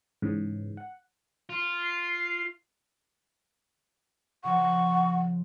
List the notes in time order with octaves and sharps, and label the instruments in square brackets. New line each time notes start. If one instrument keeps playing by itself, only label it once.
[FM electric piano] G#2 C#3 E3
F#5
[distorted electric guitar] F4
[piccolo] C7
[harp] C#3 F3 [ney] F#5 [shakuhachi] C#6